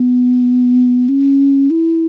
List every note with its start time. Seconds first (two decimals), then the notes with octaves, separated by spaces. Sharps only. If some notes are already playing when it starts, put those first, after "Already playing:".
Already playing: B3
1.09 C#4
1.70 E4